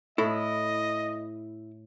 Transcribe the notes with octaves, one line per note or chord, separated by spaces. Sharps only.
A2 E4 D#5